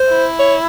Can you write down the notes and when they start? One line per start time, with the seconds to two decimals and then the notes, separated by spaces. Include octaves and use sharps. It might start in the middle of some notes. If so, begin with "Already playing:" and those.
Already playing: C5
0.09 E4
0.39 C#5